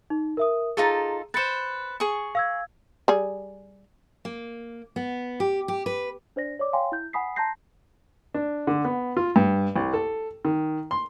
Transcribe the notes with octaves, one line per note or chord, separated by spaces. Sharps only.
D#4
A#4 E5 D#6
D#4 F4 G#4 A4 A#5
B4 C5 A6 C#7 E7
G#4 C#6
F5 E6 G#6
G3 G#4
A#3
B3
G4
G4
B4
D4 C5 D5 A#6
C#5 D5 D6
C#5 F5 G5 G#5 C6
E4 G6
F#5 G#5 B5 D#6 B6 C7
A5 A#5 C6 G6 A#6 C7
D4
D3
B3
F4
G2
C2
A4
D#3
C6